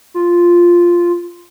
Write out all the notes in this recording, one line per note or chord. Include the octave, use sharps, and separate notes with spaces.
F4